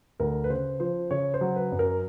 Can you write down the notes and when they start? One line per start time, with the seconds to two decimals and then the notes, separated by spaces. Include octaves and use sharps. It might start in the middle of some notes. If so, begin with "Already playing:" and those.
0.20 D2 A#4
0.44 B4
0.50 C#3 C5
0.80 F3 C5
1.11 C#3 C#5
1.34 C5
1.41 F#3
1.56 B4
1.72 F#2
1.79 A#4